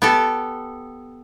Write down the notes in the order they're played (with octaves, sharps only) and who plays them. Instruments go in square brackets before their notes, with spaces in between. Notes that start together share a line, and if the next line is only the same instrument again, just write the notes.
[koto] B3 G4 A4